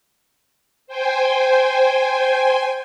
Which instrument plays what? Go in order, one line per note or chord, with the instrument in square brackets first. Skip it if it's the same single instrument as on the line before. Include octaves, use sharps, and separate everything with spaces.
[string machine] C5 G5 G#5